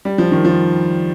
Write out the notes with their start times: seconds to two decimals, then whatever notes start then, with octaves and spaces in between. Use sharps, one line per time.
0.05 G3
0.18 F3
0.32 D#3
0.45 F3